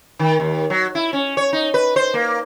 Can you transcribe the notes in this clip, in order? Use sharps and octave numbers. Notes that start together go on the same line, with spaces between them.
D#3
D#2
F#3
E4
C#4
C#5
D#4
B4
C5
A#3